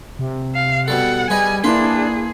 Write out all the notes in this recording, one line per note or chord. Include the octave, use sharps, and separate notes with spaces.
C3
F5
B2 G3 A4 F#5
G3 G#4 B4 D#5 G#5
A#3 D4 E4 G#4 B4 B5 C6